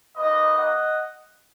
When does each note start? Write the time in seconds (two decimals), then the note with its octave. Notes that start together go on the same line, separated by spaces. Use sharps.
0.16 A#3 D#4 F#4 B4 D#5
0.57 D#5 F#5